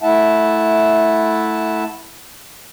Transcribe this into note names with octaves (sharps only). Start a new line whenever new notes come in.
A3 E4 E5 F#5 A5